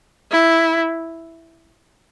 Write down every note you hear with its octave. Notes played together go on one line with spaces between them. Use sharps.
E4